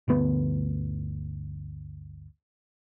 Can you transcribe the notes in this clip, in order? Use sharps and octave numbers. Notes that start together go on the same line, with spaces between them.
G1 D2 B3